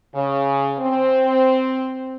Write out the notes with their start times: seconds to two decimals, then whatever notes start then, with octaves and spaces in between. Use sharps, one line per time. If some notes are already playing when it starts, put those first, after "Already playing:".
0.15 C#3
0.80 C4